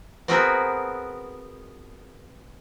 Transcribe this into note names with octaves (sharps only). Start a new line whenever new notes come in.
B3 C4 F#4 G#4 A#4 B4